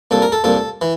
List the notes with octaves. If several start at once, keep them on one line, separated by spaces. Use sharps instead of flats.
C2 A#2 A4
A#4
A4
C2 A#2 A4
E3